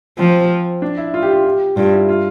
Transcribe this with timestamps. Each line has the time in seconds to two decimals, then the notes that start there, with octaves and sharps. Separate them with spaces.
0.18 F3 C4
0.82 D4
0.97 E4
1.14 F4
1.22 G4
1.32 F4
1.45 G4
1.76 G2 F4
1.92 E4
2.09 F4